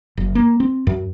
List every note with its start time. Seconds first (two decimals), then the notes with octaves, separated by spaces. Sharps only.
0.17 F#1
0.35 A#3
0.60 C4
0.87 F#2